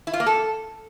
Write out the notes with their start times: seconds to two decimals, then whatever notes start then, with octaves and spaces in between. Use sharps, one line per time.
0.07 E4
0.13 F4
0.20 A#3
0.26 A4